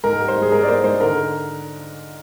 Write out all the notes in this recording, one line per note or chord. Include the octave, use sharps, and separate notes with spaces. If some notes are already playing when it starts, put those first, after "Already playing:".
G#2 A#4
G3
C5
G#2
G#4
G#2 A#4
D5
A#3 C5
G#2 C5
D3 A#4